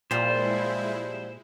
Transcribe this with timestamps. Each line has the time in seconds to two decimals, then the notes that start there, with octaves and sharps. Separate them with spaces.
0.11 A#2 F3 G3 G#3 E4 C5